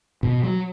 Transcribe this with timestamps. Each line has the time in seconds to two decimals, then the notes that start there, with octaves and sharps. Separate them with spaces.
0.23 B2
0.44 F#3